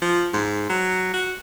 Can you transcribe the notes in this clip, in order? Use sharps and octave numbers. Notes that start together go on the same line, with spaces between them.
F3
G#2
F#3
F#4